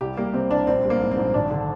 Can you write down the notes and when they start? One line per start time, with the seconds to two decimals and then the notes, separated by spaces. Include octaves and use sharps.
0.01 C2 G4
0.17 G3 A#3
0.34 C3 C4
0.50 C2 D4
0.67 A#1 C4
0.84 G3
0.90 A#3
1.01 G#2
1.11 C4
1.18 A#1
1.34 G#1 D4
1.51 D3